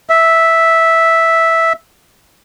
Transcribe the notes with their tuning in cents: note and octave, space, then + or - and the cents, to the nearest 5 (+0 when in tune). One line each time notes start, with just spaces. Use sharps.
E5 -5